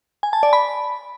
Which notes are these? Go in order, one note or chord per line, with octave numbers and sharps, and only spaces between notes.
G#5
A5
D5
B5